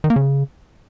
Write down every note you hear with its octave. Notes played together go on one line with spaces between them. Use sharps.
D#3
A#3
C#3